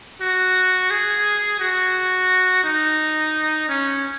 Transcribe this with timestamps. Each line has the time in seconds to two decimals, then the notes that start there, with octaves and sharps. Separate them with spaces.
0.21 F#4
0.91 G#4
1.60 F#4
2.64 D#4
3.69 C#4